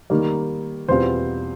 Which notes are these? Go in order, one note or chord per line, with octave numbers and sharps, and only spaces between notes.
D#3 G3 A#3
E2 B2 G3 C4 F4 C5